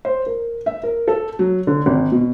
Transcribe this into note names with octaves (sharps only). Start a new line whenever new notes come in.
C5
A#4
E5
A#4
A4
F#3
D3
G#1
B2